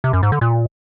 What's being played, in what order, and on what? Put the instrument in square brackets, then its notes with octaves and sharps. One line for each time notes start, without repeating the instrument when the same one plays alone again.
[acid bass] C3
F#2
G#2
D3
A#2